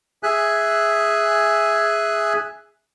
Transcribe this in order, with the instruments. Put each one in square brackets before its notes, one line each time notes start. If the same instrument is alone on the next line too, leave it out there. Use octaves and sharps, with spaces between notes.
[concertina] G#4 E5 G#5 F#6